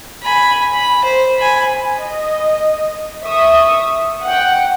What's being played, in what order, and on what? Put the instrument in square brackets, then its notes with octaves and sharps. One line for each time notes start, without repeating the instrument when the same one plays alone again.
[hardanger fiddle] G#5 B5
B5
C5
G#5 B5
[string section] D#5
E5 C#6 D#6
F#5 G5